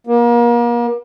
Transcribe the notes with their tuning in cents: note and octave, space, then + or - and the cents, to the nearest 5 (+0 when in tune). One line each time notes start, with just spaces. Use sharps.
A#3 +35